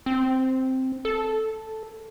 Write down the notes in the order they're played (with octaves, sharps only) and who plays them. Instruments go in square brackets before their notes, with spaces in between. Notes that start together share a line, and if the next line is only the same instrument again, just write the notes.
[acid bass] C4
A4